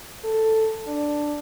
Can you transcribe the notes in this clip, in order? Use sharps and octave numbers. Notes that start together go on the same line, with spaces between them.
A4
D4